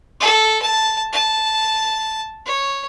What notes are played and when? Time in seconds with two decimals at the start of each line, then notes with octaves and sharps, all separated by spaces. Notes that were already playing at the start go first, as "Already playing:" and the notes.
0.20 A4
0.62 A5
1.13 A5
2.46 C#5